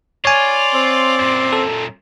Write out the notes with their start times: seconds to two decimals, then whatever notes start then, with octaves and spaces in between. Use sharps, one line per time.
0.25 F4 C#5 D5 G#5
0.74 C4
1.20 F#2 A#2
1.53 A4